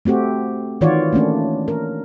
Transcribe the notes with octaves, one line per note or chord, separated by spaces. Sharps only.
A3 C4 F#4 G4
D#3 E3 F4 F#4 C#5 D5
A3 A#3 C#4 D4
A#4